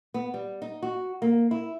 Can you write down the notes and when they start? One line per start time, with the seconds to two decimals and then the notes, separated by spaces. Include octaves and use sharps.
0.14 B3
0.34 G3
0.62 D#4
0.82 F#4
1.22 A#3
1.51 E4